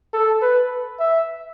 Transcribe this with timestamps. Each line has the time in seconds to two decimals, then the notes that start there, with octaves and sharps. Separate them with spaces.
0.13 A4
0.42 B4
0.99 E5